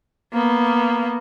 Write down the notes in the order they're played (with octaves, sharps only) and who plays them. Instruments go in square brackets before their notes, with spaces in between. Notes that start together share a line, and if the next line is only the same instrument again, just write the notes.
[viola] A#3 B3